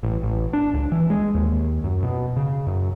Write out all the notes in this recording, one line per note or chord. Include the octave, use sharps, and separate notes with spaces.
A1
A1
D4
C#2
E3
G#3
D#2
F#2
B2
C#3
F#2